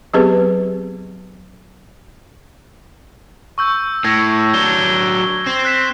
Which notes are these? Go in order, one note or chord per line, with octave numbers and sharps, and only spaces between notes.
F#3 B3 C4 G4 G#4 B4
C#6 E6 G6
A2 E6 G#6 A#6
F#3 D4 G7
C4
F#6 B6 E7